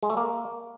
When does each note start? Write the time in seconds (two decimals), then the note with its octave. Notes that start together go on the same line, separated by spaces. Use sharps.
0.03 G#3
0.10 A3
0.17 A#3